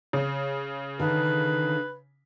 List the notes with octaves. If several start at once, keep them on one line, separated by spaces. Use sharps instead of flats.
C#3
D3 D#3 B4